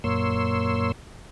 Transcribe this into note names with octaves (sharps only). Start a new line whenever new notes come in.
F#2 A#2 A#3 C#5 C6 E6